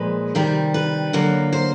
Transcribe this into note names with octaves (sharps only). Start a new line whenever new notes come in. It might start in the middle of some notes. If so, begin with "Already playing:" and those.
Already playing: A#2 F3 G#3 B4
C3 D#3 G3
B4
D3 F#3 A#3
C5